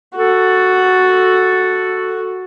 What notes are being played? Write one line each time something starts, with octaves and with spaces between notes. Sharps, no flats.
F#4 A4